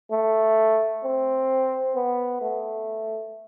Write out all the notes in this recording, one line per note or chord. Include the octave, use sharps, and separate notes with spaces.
A3
C4
B3
A3